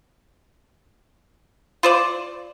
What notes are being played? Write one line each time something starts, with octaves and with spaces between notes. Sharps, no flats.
F4 C5 D5